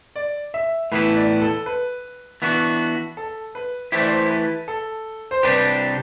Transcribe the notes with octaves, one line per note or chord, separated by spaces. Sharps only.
D5
E5
A2 E3 B3 E4 B4
D5
A4
B4
E3 B3 D4 F#4
A4
B4
E3 A3 E4 G4 C5
D5
C5
B4
A4
C5
C3 G3 D4 G4 B4